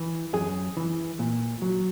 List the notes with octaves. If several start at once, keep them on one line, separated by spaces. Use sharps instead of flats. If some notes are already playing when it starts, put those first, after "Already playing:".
Already playing: E3
F#2 G#4
E3
A#2
F#3